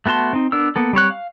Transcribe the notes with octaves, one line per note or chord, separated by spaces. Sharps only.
A3 B3 F#4 A5 C6
C4 D#4
B3 D4 A#4 E6
A#3 B3 A4
G3 C4 C#5 F#6
F5